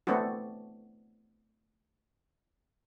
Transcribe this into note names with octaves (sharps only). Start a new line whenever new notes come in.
A3 B3 C4 D4 F#4